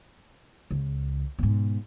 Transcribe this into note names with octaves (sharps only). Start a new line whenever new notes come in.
C#2
G#2 B2